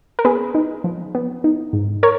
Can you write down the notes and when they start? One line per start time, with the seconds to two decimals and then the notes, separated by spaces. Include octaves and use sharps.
0.19 A#4
0.25 B3 G#4 B4
0.55 D#4
0.84 F3
1.15 B3
1.44 D#4
1.73 G#2
2.03 A#4 C#5